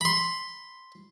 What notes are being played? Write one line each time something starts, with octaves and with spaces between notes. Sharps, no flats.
B5 C6